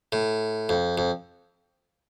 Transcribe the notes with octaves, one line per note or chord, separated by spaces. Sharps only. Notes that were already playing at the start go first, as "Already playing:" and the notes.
A2
F2
F2